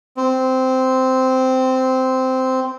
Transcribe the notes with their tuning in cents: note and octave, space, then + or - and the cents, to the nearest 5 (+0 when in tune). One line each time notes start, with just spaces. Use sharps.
C4 -10